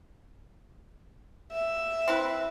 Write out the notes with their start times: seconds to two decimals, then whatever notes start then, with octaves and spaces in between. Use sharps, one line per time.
1.52 E5
2.08 C4 E4 B4